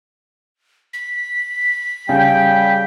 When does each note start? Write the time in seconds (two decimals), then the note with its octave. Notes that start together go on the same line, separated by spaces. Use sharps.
0.93 B6
2.09 C#3 G3 G5